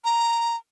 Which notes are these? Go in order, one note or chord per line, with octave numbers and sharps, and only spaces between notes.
A#5